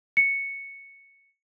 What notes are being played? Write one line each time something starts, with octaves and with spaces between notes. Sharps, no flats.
C#7